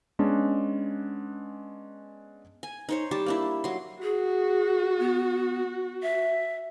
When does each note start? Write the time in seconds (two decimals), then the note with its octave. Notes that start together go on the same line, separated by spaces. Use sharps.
0.19 G#3 B3 C#4 D4
2.63 G#5
2.89 D#4 C5 C#5
3.11 G3 G4 A5
3.26 A#3 D4 E4
3.64 F#3 C6
4.03 F#4 G#4
4.99 B3
6.03 E5